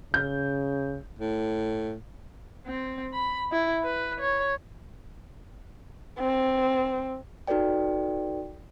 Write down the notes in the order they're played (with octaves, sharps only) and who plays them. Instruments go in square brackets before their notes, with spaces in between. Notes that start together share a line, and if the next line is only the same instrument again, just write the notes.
[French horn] C#3 [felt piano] G6
[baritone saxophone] A2
[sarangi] C4
B5
E4
B4
C#5
[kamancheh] C4
[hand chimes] D#4 F#4 A4 B4 D5 G5